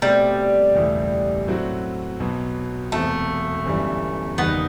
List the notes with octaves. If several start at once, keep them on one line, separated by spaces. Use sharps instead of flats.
B2 G3 A3 C4
F#1 E2 B2 A3 E4
A2 F#3 A3 C4 F#4
B1 B2 F#3 B3
E1 E2 C3 A3
G1 F#2 E3 G3
F#1 E2 D#3 G3 B3 D#4